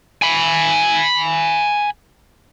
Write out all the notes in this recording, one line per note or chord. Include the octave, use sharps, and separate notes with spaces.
G#5 B5